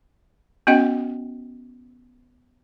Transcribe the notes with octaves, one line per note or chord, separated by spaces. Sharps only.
B3 C#4 F#4 D#5 G5